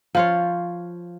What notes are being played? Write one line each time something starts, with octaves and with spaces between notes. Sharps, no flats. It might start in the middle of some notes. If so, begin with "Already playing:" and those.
F3 F4 C#5